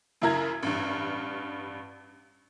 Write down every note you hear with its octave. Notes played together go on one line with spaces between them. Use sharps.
F#2 C#3 E4 A#4 A#5 G#6
A1 G2